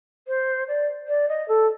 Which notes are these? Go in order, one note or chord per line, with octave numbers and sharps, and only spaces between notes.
C5
D5
D5
D#5
A4